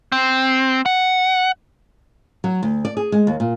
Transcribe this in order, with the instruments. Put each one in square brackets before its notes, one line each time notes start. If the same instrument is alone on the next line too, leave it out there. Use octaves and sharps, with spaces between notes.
[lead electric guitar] C4
F#5
[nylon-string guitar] F#3
D2
D5
G#4
G#3
D#2
A#2